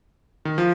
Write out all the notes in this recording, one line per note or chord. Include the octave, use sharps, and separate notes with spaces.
D#3
F3